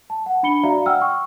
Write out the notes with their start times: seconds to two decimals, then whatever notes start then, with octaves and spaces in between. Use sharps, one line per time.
0.10 A5
0.26 F#5
0.43 D4 B5 C#7 G7
0.63 F#4 D5 E5 F5 A#5
0.86 F#5 G5 E6 F6
1.01 G5 C#6